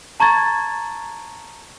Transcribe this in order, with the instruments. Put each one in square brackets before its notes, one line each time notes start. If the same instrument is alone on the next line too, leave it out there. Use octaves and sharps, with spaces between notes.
[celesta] A5 A#5 C#6 G#6 A6